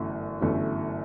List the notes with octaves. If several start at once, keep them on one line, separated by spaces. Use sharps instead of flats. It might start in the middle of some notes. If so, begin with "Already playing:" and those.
Already playing: G1 F#2 E3 A3
G1 F#2 E3 A3